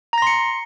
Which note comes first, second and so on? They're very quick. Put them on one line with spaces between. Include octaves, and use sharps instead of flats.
A#5 A#6 C6 C#7